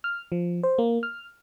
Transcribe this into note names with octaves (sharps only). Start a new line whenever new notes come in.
F6
F3
C5
A#3
F6